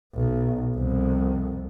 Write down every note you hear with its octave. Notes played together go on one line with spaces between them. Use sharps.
B1
C2 F2